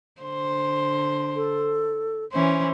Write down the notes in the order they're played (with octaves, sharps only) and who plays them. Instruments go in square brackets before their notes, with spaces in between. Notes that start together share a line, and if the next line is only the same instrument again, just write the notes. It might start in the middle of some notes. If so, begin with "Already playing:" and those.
[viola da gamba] D3 C5
[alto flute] A4
[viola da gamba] E3 C#4 C5